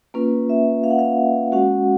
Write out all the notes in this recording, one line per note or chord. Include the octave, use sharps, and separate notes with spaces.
A#3 C#4 F4 B4
E5
F5
F#5
F5
G#3 C#4 F#4 F#5